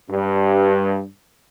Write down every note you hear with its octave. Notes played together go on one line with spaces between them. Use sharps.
G2